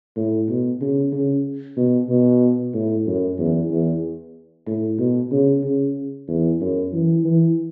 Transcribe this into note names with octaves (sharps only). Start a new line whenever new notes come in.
A2
B2
C#3
C#3
B2
B2
A2
F#2
E2
E2
A2
B2
C#3
C#3
E2
F#2
E3
E3